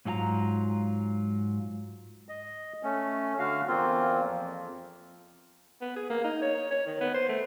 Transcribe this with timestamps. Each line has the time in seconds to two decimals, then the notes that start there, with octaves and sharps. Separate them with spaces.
0.05 G#2 F#3 F4 G#5 A#5
2.28 D#5
2.83 A3 C#4
3.39 D3 F#4 F5
3.68 E2 A#3 C4 F4
4.21 F2
5.82 B3
5.96 G#4
6.10 A#3
6.24 D#4
6.42 C#5
6.71 C#5
6.87 D#3
7.01 B3
7.14 C5
7.29 A3